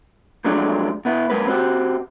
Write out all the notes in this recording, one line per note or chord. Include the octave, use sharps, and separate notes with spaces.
F3 F#3 G#3 A3 D4
B2 B3 E4
F#2 G#3 A#4 B4
C4 F#4 G4